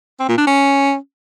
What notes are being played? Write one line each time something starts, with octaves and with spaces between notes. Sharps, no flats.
C4
A#2
D4
C#4